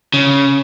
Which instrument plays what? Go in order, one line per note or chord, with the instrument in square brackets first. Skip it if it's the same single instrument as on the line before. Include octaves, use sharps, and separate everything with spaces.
[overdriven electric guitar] C#3